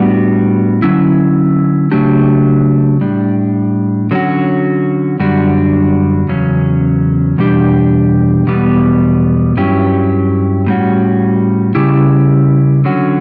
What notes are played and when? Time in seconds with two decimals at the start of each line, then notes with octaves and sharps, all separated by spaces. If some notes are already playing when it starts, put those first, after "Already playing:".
Already playing: A2 G3 B3 D4 F#4
0.82 D3 F#3 C#4 E4
1.91 C#3 F#3 A3 D4 G4
3.01 A2 G3 D4
4.11 D3 F#3 C#4 F#4
5.20 F#2 D3 G3 D4 F#4
6.28 E2 C#3 F#3 C#4
7.38 E2 B2 G3 D4 G4
8.47 E2 B2 G3 B3
9.57 G2 F#3 C#4 E4 G4
10.66 A2 G3 C#4 F#4
11.75 C#3 G3 C#4 E4 G4
12.85 D3 F#3 C#4 F#4